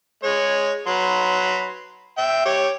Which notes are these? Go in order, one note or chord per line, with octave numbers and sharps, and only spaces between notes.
G#3 C#5
F#3 B4 C6
E5 G5
G4 C#5